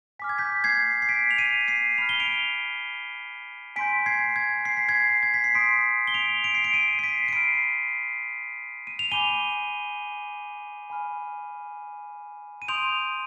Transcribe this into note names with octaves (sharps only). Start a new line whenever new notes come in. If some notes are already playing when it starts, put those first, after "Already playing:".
G#5 D6 F6 B6
G#6
G6 B6
G#6 C7
C7
B6 D7
F7
C7 D#7
C7 D#7
B5 F6 F7
G7
D7 F7
G#5 C6 G6 B6 D7
G#6 C7
G#6
C7
B6
G#6 C7
G#6
B6
C7
C6 D#6 G6 B6 D7
G7
D7 F7
D7 F7
C7
D7
C7 D#7
C7
B6 D7
D7
B5 F6 C7 D#7
D#7
F7
G#5 B5 D6 G6 D#7 G7
G#5 B5 F6
D#7
C6 D#6 G6 D7 F7